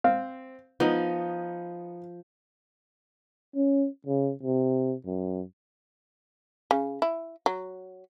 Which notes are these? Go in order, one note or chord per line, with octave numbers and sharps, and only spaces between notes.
C4 F5
F3 B3 D#4
C#4
C#3
C3
F#2
C#3
E4
F#3